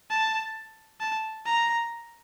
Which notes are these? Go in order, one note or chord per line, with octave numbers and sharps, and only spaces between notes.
A5
A5
A#5